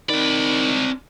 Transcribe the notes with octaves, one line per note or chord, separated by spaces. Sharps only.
C#2 D#3 C4 D5 B5